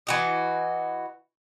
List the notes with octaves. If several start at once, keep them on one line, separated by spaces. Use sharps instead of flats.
E3 F#4 D#5